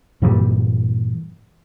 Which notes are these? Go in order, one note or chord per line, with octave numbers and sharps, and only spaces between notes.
G2 A#2 E3 G3